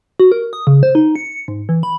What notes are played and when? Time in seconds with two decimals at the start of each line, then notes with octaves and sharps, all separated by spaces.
0.20 F#4
0.32 A#4
0.53 D#6
0.67 C#3
0.83 C5
0.95 D#4
1.16 C#7
1.48 G#2
1.69 E3
1.83 B5